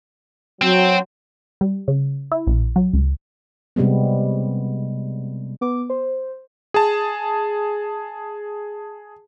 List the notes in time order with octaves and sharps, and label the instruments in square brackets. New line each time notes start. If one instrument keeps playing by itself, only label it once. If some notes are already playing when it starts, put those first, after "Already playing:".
[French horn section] F#3 [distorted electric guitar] C4
[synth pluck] G3
C#3
E4
A#1
F#3
C#2
[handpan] C3 G3 G#3 B3
[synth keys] B3 D6
C5
[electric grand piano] G#4 A5